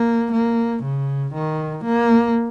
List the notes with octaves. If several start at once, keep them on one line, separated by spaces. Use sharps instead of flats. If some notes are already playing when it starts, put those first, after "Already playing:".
Already playing: A#3
A#3
C#3
D#3
A#3